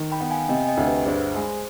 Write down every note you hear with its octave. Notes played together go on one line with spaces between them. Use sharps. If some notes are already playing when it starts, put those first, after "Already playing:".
Already playing: D#3
G5 B5
B3
F5 G#5
C3 D#5 G5
G#5
D#5 G5
D2
G4 B4
G2 G#4 C5
G#3